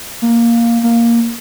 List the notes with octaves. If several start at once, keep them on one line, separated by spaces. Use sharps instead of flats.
A#3
A#3